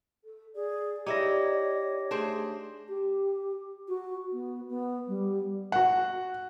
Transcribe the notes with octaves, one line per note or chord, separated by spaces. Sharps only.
A4
G#4 D5
D#4 E4 G4 C#5 A#6
A3 D4 G#4 C5
G4
F#4
B3
B3
G3
F#4 F#5